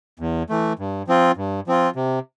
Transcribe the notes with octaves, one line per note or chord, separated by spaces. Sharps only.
E2
E3 A3
G2
F3 C4 F4
G2
F3 C4 F4
C3